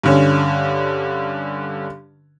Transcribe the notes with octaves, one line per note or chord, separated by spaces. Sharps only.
G2 D3 C#4